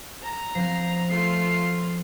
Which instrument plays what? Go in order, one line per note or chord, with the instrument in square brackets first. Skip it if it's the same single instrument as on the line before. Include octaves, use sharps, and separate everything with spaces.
[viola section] A#5
[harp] F3 B3 C4 [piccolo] C7
[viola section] A3 F4 [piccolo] C7